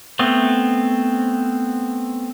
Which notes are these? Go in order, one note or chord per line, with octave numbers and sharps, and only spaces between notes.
A3 B3 C4